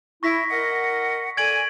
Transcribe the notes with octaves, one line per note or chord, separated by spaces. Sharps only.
E4 C#6 A#6 B6
A#4 D#5 F#5
A4 D5 G#5 G#6 D7 F#7